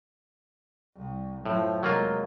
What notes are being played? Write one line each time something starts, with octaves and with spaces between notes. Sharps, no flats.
C2
F#2 A2 F3
F1 F#3 G#3 A#3 F4